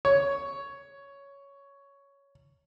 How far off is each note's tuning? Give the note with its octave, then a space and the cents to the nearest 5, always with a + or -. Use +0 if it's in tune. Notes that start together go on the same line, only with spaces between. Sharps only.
C#5 +10